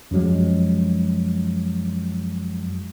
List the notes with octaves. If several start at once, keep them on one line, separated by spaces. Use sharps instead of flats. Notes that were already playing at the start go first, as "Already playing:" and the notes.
F#2 F3 F#3 G#3